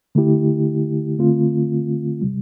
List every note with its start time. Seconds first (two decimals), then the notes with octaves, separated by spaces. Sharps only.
0.15 D3 A3 E4 G4
1.19 D3 A3 C4 F4
2.22 C3 G3